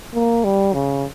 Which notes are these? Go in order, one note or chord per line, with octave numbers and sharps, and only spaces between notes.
A#3
G3
C#3